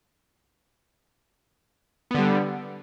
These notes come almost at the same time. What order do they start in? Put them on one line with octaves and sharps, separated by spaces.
B3 D3 G3